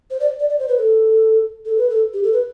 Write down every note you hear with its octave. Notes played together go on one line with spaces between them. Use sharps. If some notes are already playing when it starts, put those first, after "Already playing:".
C5
D5
D5
D5
C5
B4
A4
A4
B4
A4
G4
A4
B4